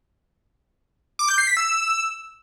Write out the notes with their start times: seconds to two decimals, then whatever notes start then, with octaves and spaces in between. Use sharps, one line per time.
1.19 D6
1.29 G6
1.38 C7
1.47 B6
1.57 E6